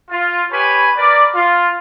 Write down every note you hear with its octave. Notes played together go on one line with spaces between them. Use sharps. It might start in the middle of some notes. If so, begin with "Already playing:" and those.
F4
G4 B4 C#5 G#5 B5
A#4 B4 D5
F4